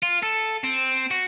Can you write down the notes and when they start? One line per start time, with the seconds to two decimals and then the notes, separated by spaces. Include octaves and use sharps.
0.03 F4
0.23 A4
0.64 C4
1.11 F#4